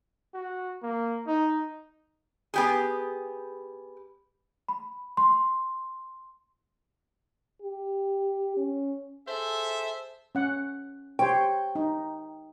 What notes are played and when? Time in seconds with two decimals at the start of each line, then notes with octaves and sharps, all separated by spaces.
0.34 F#4
0.83 A#3
1.27 D#4
2.54 B3 G4 G#4
4.68 B5
5.17 C6
7.62 G4
8.57 C#4
9.28 G#4 A4 C5 E5
10.35 C#4 F#5
11.19 G4 C5 C#5 G5
11.75 D#4